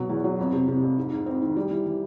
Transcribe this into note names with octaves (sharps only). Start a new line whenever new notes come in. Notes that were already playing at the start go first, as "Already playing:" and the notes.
Already playing: B2 F#3
E2
F#3
F2
C3
C3
F2
G#2
G#2
C4
D#3
G3
E3
E3